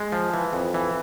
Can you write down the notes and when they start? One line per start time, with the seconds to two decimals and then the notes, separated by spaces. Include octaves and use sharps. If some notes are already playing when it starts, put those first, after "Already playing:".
Already playing: G#3
0.12 F3
0.34 E3
0.53 F2
0.74 E3